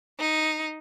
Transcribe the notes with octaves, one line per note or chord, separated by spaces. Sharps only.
D#4